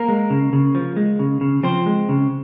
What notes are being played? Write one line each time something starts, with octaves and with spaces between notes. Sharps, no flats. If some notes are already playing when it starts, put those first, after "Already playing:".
Already playing: A#3 A#4
G#3
C#3
C#3
F3
G#3
C#3
C#3
F3 C4 C5
G#3
C#3